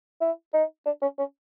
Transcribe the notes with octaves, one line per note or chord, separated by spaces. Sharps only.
E4
D#4
D4
C#4
C#4